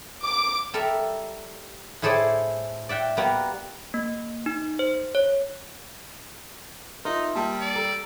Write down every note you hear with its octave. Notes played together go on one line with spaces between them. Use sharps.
D6
G3 A4 A#4 E5
A2 E4 G#4 A4 C5 D5
D5 E5 F#5 G5
G3 A#3 B3 F#4
A#3
D#4
C5
C#5
D#4 F4 A#4 E5 C6
G3 A#3 A#4 A5
D5
A4 A#5